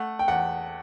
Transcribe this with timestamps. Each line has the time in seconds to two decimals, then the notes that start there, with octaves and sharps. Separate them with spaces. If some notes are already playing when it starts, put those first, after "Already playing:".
Already playing: A3 F#5
0.19 G5
0.28 E2 F#5